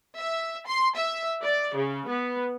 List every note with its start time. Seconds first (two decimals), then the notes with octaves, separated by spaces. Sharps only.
0.17 E5
0.67 C6
0.97 E5
1.42 D5
1.74 C#3
2.07 B3